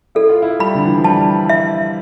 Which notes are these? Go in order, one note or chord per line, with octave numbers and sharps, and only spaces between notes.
E4 A4
F4
E4
G3 B5
D3
E3
F3
G3 A5
E5